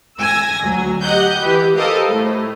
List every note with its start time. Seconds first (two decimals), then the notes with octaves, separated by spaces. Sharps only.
0.19 G#5 E6 G#6 A#6
0.63 D2 F#3
1.02 G4 D#5 F#5 G6
1.41 E3 G4 B4
1.76 G4 A4 A#4 C5 D#5 F5
2.09 A2